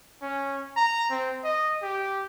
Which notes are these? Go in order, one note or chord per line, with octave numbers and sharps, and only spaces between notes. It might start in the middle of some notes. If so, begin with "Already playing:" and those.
C#4
A#5
C4
D#5
G4